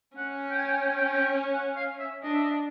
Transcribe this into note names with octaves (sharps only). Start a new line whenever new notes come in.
C#4 F#5
G5
G#5
G5
G#5
G5
G#5
G5
G#5
G5
F#5
F5
E5
D4 D#5
E5
D#5